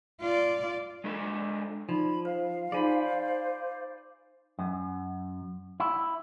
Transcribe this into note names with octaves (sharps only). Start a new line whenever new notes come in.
F4 D5
G#3 D4 A4
F3 D#4 D5 B5
C5 F5
D#4 F4 G#4 C5 D5 G#5 B5
F#2
E4